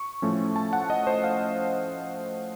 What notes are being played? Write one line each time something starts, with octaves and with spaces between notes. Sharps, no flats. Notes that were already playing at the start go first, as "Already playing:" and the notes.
Already playing: C#6
A2 F3 A3 C#4
A5
F#5
D#5
C5
F5